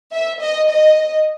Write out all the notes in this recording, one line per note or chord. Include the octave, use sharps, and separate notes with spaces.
E5
D#5
D#5